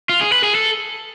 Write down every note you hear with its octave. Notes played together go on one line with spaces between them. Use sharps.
F4
G#4
B4
G#4
A4